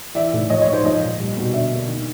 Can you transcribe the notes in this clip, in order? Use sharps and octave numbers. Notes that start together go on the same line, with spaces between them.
E3 D5 E5
A2
F3 C#5 D#5
C#5 D#5
G#2
C5 D5
F3 C#5 D#5
A#2
G3
B2
D3 D5 E5
A#3
D#3